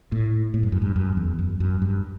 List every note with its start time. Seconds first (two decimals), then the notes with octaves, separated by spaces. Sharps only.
0.12 A2
0.54 A2
0.63 G2
0.72 F#2
0.82 G2
0.96 F#2
1.17 E2
1.39 F#2
1.60 F#2
1.82 G2